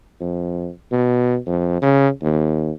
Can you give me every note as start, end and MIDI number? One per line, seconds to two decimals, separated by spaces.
0.20 0.68 41
0.92 1.37 47
1.46 1.82 41
1.82 2.08 49
2.22 2.71 39